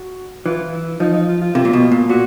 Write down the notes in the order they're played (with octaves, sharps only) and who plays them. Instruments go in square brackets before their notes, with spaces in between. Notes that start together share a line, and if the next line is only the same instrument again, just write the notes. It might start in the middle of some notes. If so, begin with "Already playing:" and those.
Already playing: [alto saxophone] F#4
[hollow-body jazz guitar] E3 [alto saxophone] F4
[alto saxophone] E4
[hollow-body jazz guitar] F3 [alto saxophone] D#4
[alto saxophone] D#4
F4
F4
[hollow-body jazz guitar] C3 [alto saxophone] F4
[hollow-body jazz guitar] A#2
B2
A#2
[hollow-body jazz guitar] A#2 [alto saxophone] F#4